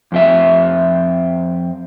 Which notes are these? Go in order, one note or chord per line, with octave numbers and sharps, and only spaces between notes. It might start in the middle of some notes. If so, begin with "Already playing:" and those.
F2 C4 E5